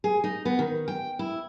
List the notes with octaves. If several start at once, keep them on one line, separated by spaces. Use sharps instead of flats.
G#4
D#4
B3
D#3
G5
E4